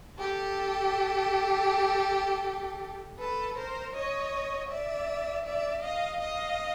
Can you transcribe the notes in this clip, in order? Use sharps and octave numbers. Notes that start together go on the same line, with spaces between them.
G4 A4
A4 B4
A#4 C5
C#5 D#5
D5 E5
D5 E5
D#5 F5
D#5 F5